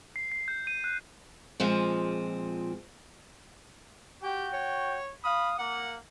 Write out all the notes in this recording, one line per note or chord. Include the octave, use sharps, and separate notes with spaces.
C7
C7
G6
D#7
F#6
A#2 F3 G#3 C4
F#4 G4 G5
C#5
F5 B5 D#6
A#3 F#5